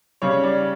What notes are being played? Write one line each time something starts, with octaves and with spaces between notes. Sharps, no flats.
C#3 G3 C#5
D5